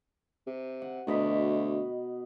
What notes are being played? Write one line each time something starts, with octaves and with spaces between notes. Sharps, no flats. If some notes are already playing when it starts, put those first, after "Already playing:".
C3
F#5
D2 B2 D#5 B5